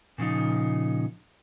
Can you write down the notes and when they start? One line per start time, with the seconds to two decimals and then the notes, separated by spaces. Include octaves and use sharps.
0.18 A#2 C#3 F3 D#4